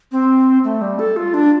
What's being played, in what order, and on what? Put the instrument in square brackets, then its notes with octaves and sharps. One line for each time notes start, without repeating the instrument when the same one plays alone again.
[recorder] C4
A3
G3
A4
F4
D4